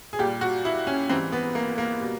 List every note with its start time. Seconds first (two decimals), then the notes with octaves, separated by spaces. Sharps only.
0.13 G#4
0.19 A#2 G4
0.23 G3
0.41 F#4
0.65 E4
0.87 C#4
1.10 G#2 E3 G3 C4
1.32 B3
1.55 A#3
1.78 A#3
2.01 B2 G3